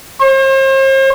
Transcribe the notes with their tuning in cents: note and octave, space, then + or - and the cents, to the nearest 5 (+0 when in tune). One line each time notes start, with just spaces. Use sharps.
C5 +40